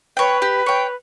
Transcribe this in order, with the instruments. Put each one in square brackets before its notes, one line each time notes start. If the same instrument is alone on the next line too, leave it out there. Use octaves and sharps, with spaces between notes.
[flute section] B4 [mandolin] C#5 G5
[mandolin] G4
C#5 G5